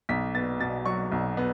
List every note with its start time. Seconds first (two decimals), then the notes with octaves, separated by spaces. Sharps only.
0.09 B1 B6
0.35 B3 A6
0.60 B2 A6
0.85 F#3 C#6
1.12 B1
1.37 B3